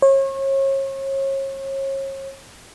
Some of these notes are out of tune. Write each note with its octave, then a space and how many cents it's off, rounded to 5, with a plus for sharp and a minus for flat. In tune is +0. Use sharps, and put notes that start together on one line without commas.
C#5 -35